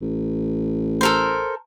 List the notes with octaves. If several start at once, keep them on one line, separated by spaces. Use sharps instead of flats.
A1
A4 A#4 C5